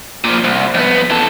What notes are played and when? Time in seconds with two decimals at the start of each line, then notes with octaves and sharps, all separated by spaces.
0.24 A#2 F3
0.44 C2
0.74 F2 B3
1.11 E3 A4